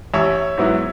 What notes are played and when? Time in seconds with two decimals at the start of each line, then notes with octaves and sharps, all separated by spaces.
0.14 A1 C#5 E5
0.58 G#2 F#3 B3 E4